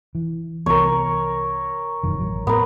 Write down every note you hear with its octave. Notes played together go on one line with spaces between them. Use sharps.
E3
C2 E3 B3 A#4 C#5
E1 F#2 D#3
A1 F#3
A2 B3 A#4